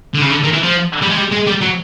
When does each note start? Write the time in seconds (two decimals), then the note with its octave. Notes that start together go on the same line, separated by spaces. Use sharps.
0.14 D3
0.22 C#3
0.30 D3
0.44 D#3
0.53 E3
0.63 F3
1.02 G3
1.11 G#3
1.17 G3
1.32 G#3
1.47 G3
1.62 F#3